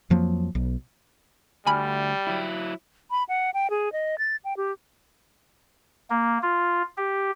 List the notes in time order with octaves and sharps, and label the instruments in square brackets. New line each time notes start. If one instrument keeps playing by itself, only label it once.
[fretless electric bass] F2 F3 F#3 A#3
B1
[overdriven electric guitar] D2 [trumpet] G3 [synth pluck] G#5 B5 F6
[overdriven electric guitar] F#3 E4
[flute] B5
F#5
G5
G#4
D#5
A6
G5
G4
[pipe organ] A#3
F4
G4